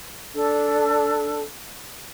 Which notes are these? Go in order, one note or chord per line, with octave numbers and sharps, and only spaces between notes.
D4 A4